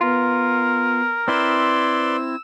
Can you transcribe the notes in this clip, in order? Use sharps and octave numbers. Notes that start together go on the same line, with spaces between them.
B3 F4 A#4
C4 E4 B4 C5 D5 C6 E6